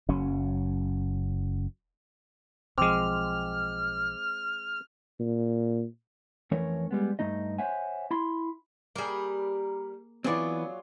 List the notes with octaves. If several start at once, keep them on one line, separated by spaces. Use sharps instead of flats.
F#1 F#3 C#4
B1 F3 G#3 C4 D6 F6
A#2
F2 E3 A3 C#4 A#4 C#5
G3 G#3 B3
G2 A3 D#4 D#5
C5 C#5 E5 F#5 G#5
E4 B5 C6
G3 A#3 G#4 A#4
E3 F#3 B3 C4 F4 G#4 D5